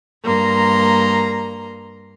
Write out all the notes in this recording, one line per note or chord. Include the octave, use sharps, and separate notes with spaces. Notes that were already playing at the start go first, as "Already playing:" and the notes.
G2 A#3 A#5 C6